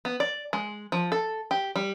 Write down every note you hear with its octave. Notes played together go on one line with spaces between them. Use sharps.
B3
D5
G#3
F3
A4
G4
G3